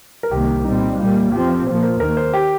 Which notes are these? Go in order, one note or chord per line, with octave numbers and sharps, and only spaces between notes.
A#4
C2 C3 D#3 A#3 G4
A#2 G3 C4 D#4
A#2 G3 A#3 F4
F2 F3 C4 G4
C5
A#2 F3 A#3 C5
A#4
D#2 D#3 A#3 A#4
C5
G4